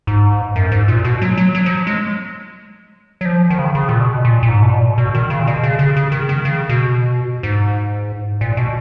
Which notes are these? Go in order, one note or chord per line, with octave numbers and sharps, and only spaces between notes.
G#2
F#2
G#2
A#2
B2
F#3
F#3
F#3
F3
F#3
G#3
F#3
F3
D#3
C#3
D#3
C#3
A#2
B2
A#2
A#2
G#2
B2
A#2
B2
D#3
C#3
A#2
B2
C#3
C#3
C#3
D#3
D#3
C#3
B2
G#2
A#2
B2